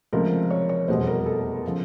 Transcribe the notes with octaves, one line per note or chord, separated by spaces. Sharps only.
C#2 C3 F3 A3 A#4
C#5
C#5
F1 E2 B2 G3 C5
A#4
A4
C#3 F3